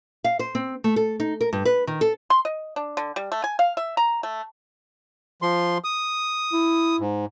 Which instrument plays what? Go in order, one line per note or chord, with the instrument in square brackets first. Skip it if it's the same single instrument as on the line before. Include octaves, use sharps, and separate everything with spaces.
[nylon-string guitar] F5
C5
C4
A3
A4
D#4
A#4
G2
B4
D#3
A4
[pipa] C6
D#5
D4
D3
G3
A3
G#5
F5
E5
A#5
A3
[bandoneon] F3 C6
D#6
[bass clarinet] E4
[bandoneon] G#2